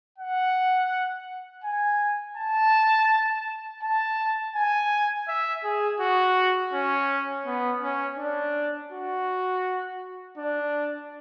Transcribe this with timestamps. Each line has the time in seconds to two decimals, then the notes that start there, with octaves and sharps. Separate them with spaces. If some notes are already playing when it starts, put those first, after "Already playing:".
0.18 F#5
1.64 G#5
2.37 A5
3.83 A5
4.55 G#5
5.28 E5
5.64 G#4
6.00 F#4
6.73 C#4
7.46 B3
7.82 C#4
8.18 D4
8.92 F#4
10.37 D4